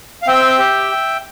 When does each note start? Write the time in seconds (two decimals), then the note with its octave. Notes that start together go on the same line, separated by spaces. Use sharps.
0.22 F5
0.27 C4 E5 G5
0.59 G4